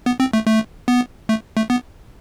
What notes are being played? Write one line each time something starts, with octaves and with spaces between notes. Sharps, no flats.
B3
C4
A3
A3
B3
A3
A3
B3